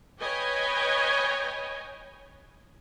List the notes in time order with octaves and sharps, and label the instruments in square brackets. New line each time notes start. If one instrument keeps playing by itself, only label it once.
[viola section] B4 C#5 D#5 G5 G#5